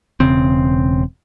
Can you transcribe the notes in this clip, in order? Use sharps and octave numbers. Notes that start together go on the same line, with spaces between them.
E1 C#3 C4